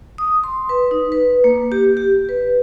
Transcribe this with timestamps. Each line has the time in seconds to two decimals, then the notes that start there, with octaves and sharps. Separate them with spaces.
0.18 D#6
0.44 C6
0.69 B4
0.91 D#4
1.12 B4
1.44 A#3
1.58 A#3
1.72 G4
1.97 G4
2.29 B4